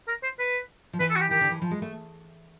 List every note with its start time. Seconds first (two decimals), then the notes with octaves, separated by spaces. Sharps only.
0.08 A#4
0.23 C5
0.39 B4
0.93 F3
1.00 E3 B4
1.10 A4
1.16 F#4
1.21 G4
1.31 D#3 G4
1.41 D3
1.51 E3
1.62 F3
1.71 G#3
1.82 A3